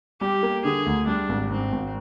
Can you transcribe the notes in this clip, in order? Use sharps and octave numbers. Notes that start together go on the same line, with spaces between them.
G3 G4
A#3
D3 G#4
D2
G3 D4
G#1
G#2 C4
G#1